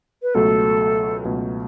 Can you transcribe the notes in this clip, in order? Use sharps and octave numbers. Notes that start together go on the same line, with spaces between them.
B4
C#2 B2 F#3 A3 A4
C#2 B2 F#3 A3